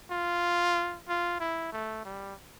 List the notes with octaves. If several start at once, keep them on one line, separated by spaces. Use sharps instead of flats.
F4
F4
E4
A3
G3